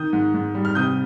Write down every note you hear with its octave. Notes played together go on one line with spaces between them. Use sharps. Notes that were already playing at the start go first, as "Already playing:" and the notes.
Already playing: D#3 D#6 G6
G#2
G#2
G3
F6
C3 D#6 G6